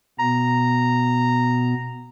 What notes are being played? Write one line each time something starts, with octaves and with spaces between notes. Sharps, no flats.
B2 B3 A#5